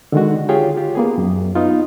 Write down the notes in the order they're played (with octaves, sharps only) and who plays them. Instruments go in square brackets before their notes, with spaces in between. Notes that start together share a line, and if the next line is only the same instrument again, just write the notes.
[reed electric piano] D3 D#3 G#3 F#4
F4 G4 G#4 C#5 G5
F4 G4
A#3 B3 G#4
F#2
B3 D#4 F4